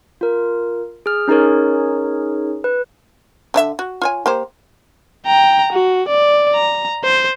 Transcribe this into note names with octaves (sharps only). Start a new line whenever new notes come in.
F4 A#4
G#4 F6
C#4 D#4 G#4 A#4 C#5
B4
D3 D4 E5
F#4
F4 C#5 G#5
A#3 G4 C5
G5 A#5
F#4
D5
A#5
C5